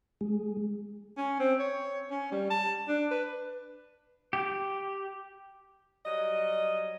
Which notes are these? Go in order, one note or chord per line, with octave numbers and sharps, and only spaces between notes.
G#3
C#4
C4
C#5
C#4
G3
A5
D4
B4
G4
F#3 G3 D#5